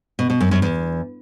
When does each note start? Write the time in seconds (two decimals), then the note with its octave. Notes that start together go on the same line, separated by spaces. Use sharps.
0.19 B2
0.30 B2
0.40 F#2
0.51 F#2
0.62 E2